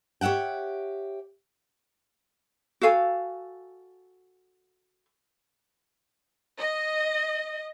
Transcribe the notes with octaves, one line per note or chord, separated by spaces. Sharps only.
G4 C#5 E5 F#5 G5
F#4 A4 F5 G#5
D#5